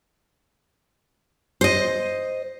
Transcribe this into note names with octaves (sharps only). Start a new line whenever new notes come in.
C5 D#5